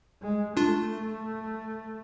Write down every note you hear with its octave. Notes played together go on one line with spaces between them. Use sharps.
G#3
A3 D4 F4